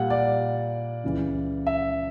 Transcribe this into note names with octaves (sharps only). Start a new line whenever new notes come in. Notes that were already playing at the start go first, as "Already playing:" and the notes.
Already playing: A#2 G3 F#5
D5
C#2 C#3 E3
E5